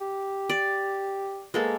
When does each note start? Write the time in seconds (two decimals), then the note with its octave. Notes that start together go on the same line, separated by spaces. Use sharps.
0.01 G4
0.49 D5
1.54 G#3 A#3 B3 A4